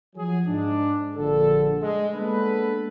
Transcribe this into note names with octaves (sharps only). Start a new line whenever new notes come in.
F3 F#3 G#4
G#2 D4
A#1 D3 A4
G#3
G#3 A#3 B3 D4 A4 B4